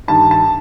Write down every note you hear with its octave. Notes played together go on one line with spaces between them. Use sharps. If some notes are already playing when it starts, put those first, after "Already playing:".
G2 D#3 A5
A5